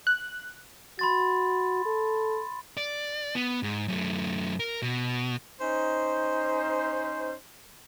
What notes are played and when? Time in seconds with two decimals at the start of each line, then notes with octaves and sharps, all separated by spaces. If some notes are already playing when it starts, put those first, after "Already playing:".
0.07 F#6
0.99 F#4 B5 C6 A6
1.86 A4
2.77 D5
3.35 B3
3.63 G#2
3.88 F#2 A3
4.60 A#4
4.82 B2
5.61 C#4 D#4 C5